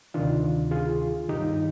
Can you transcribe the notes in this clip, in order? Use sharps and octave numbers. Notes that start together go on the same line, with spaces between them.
D2 C3 D#3 D4 F4
F4 G#4
G2 D#3 D#4 G4